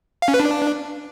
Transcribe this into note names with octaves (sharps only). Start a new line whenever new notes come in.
F5
C#4
B4
D4